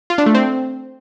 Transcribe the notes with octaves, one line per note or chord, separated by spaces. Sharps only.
F4
D4
A3
C4